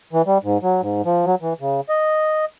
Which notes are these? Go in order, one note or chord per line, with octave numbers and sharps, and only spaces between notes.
E3
G3
G#2
F#3
G#2
F3
F#3
E3
C#3
D#5